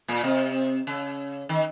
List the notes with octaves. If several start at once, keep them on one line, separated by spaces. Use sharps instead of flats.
A#2
C3
C#3
D#3